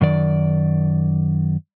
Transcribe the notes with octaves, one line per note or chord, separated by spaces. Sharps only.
F#2 D#3 D5